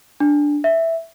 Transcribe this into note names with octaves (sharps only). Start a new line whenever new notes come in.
D4
E5